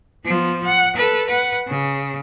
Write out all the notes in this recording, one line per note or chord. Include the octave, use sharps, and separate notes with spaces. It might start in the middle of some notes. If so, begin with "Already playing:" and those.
F3 B3
F#5
A4 B4
B4 F#5
C#3